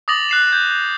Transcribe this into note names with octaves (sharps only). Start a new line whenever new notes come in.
D6 D#6 A6 A#6 F7 F#7
F#6 C7 E7
G6